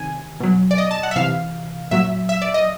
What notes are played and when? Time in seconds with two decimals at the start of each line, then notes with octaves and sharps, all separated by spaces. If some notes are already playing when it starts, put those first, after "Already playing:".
Already playing: C3 D#3 G#5
0.40 B2 F#3
0.71 D5
0.78 D#5
0.91 A5
1.03 F#5
1.11 E5
1.16 C3 E3 F5
1.91 A#2 F#3 E5
2.29 E5
2.42 D5
2.54 D#5